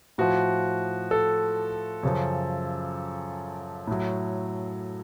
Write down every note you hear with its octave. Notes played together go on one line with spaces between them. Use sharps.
A2 F3 F#4
A4
F#2 C#3 F3
A2 F#3